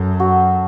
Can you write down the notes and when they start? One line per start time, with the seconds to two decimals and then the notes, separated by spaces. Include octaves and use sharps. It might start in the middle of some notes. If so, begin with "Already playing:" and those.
Already playing: F#2 A4
0.20 F#4